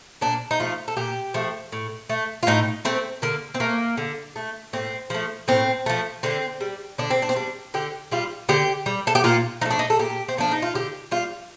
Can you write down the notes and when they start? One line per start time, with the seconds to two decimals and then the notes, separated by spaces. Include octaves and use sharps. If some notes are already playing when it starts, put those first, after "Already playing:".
0.21 A#2 D4
0.51 D#4
0.60 F3 A3 F4
0.88 A4
0.97 A#2 G4
1.34 F3 A3
1.72 A2
2.10 A3
2.43 F4
2.47 A2 D#4
2.85 A3 C4
3.22 D3 A#3
3.54 C4
3.60 A3 A#3
3.97 D3
4.36 A3
4.73 A2 C4
5.10 F3 A3
5.48 A2 C4
5.86 F3 A3
6.23 D3 C4
6.61 G3
6.98 D3 D4
7.10 C4
7.22 D4
7.29 C4
7.36 G3 D4
7.74 D3 G4
8.12 G3 F4
8.49 D3 G4
8.86 G3
9.07 A4
9.15 G4
9.24 A#2 F4
9.61 F3 D#4
9.66 A3 D4
9.79 D#4
9.90 A4
9.99 A#2 G4
10.28 C4
10.37 F3 A3 D4
10.51 D#4
10.62 F4
10.75 D3 G4
11.11 G3 F4